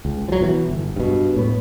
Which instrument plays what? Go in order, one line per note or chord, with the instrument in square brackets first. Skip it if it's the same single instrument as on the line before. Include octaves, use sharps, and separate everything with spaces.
[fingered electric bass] C#2
F3 F#3
B2 E3
G1
G2 B2
A2 B3